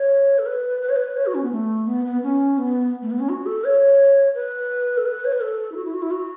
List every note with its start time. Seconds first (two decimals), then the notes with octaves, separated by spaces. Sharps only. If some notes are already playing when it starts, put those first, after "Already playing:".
Already playing: C#5
0.39 A4
0.46 B4
0.81 B4
0.89 C#5
0.96 B4
1.17 C#5
1.26 F#4
1.35 C#4
1.43 B3
1.52 A3
1.87 B3
2.05 B3
2.23 C#4
2.58 B3
3.02 A3
3.11 B3
3.20 C#4
3.29 F#4
3.46 A4
3.65 C#5
4.35 B4
4.98 A4
5.06 B4
5.25 C#5
5.33 B4
5.41 A4
5.72 E4
5.76 F#4
5.85 E4
5.94 F#4
6.02 E4
6.11 F#4